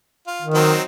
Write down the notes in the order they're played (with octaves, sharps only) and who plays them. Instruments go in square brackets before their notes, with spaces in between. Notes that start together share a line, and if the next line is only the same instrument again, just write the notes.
[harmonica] F4
[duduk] D#3
[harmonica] F#3 C4 D#4